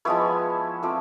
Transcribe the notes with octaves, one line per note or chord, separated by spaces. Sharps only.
F3 G#3 B3 E4 B4 C#5
F3 A3 C4 F4 C5 D5